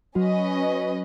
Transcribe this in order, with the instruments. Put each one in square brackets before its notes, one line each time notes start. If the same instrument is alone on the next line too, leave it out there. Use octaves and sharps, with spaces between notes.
[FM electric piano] F#3 F#4 [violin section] C#4 B4 D#5